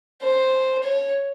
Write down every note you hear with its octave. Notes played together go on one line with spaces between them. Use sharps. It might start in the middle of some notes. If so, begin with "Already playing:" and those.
C5
C#5